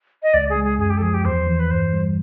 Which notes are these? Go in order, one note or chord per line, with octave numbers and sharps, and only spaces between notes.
D#5
C#2 D5
G#4
G#3
G#4
F#2 G#4
G4
A4
F3 G#4
G4
E2 C5
E3
B4
G2 C5
G3